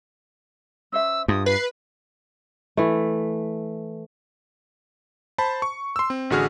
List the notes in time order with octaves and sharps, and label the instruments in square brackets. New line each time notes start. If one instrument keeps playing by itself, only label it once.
[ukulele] C#4 C5 E5 [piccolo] E6
[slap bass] G2 [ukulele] F4 [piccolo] D#6
[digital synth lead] B4 [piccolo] C7
[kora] E3 A3
[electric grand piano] C5 A5 B5
C#6
C6 E6
C4
A1 D3 F#4 G#4 F6